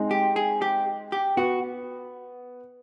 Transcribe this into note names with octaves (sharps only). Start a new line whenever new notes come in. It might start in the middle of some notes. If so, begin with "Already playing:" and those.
Already playing: G#3 C4 D#4
G4
G#4
G4
G4
B3 F#4